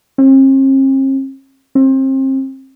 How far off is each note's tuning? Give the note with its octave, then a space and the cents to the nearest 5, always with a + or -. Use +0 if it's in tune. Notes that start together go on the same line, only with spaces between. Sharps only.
C4 +45
C4 +30